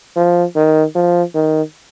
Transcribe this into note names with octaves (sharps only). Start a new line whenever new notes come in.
F3
D#3
F3
D#3